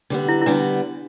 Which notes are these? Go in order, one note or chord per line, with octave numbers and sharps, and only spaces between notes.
D3 G3 B3
E4
E4
D3 G3 B3 D4